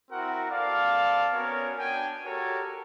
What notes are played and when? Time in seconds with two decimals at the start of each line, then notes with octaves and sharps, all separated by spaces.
0.11 C4 E4 F#4 A#4 F#5
0.50 C4 A4 D5 F5
1.33 B3 C#4 F#4 A#4 C#5
1.79 B3 D4 G5 G#5
2.26 F#4 G4 A4 A#4 C#5